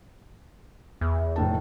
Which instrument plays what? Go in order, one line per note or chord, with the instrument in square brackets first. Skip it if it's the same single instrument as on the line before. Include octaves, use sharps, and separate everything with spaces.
[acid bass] E2
[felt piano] F1 A2 A5